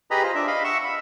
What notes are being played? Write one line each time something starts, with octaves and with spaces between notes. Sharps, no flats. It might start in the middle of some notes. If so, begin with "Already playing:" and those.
G4 G#4 B4 D#5 A#5 B5
F4 C5 D#5
D4 E5
D#5 F5 B5
E5 F#5 C#6 E6
B5